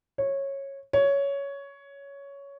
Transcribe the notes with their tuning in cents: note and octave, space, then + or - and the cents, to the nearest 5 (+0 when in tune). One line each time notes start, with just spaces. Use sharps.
C#5 -15
C#5 +10